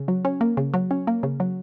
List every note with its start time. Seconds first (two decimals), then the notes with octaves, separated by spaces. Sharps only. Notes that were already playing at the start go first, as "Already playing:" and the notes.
Already playing: C#3
0.08 F#3
0.25 C#4
0.41 A#3
0.57 C#3
0.74 F#3
0.91 C#4
1.07 A#3
1.23 C#3
1.40 F#3